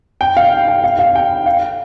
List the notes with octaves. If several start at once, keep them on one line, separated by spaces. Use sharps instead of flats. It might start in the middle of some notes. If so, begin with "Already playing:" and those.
G5
F5
G5
F5
F5
G5
F5